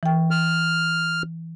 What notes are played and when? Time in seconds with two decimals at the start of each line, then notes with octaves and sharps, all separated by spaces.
0.03 E3 G5
0.31 F6